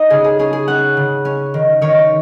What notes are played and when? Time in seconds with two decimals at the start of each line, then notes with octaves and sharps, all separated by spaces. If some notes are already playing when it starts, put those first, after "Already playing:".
Already playing: D#4 D#5 A#5
0.10 C#3 G#4
0.24 G#4
0.39 C#4 G#4
0.53 G#4
0.68 C#4 F#5
0.97 C#3
1.25 C#4
1.54 D#3
1.81 D#3 C#5